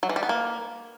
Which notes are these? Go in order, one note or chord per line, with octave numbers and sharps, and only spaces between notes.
F#3
E3
G3
B3
A#3